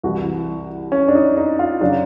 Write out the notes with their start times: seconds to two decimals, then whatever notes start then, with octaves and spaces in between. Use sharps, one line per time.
0.03 C2 C3 E3 F#4
0.92 C#4
1.08 D4
1.15 D#4
1.37 D#4
1.59 F4
1.81 C#3 F#3 D4